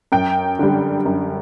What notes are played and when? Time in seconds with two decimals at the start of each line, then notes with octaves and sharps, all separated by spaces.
0.12 F#2 G5
0.59 D3 G3
1.05 F#2